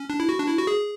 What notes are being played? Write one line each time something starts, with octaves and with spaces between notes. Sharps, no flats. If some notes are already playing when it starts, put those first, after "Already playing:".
Already playing: C#4
D4
E4
F#4
D4
E4
F#4
G#4